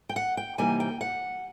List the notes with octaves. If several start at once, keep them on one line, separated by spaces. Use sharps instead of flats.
G5
F#5
G5
C3 E3 G3 A#3 D#4 G#5
G5
F#5